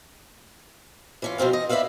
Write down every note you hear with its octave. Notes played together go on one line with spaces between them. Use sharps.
E3 C#4 F4
B2 F3 C4 F5
D#5
E4 B4 D5 E5 F5